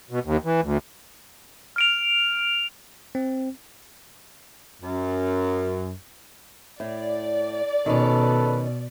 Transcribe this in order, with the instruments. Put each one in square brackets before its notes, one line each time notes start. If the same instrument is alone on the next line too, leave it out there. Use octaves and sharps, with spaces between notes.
[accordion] B2
D#2
E3
D2
[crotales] F6 D7 F7
[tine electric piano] C4
[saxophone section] F#2
[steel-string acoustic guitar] A2 [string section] D5
[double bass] B2 [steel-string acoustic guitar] D#3 C#4 [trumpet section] A4 B4